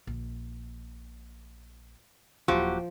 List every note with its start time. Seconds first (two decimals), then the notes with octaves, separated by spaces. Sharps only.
0.07 A#1
2.48 D#1 F3 F#3 E4 F#4 G4